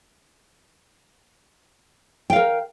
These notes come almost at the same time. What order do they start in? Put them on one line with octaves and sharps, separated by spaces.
G5 F5 A#4